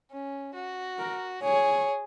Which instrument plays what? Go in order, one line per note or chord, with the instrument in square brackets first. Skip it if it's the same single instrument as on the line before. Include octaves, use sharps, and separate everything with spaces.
[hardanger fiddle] C#4
F#4
[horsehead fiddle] A#4
[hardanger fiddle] G#4 [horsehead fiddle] C#5